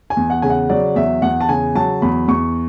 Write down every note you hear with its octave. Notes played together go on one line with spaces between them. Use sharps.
G#5
E2
F#5
C#3 G#5
F#5
F#3 D5
E2 E5
E2 F#5
A5
C#3 G#5
F#3 A5
E2 B5
E2 C#6